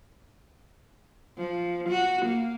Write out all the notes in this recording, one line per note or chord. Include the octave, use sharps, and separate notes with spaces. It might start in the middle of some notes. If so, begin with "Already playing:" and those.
F3
F#4
A#3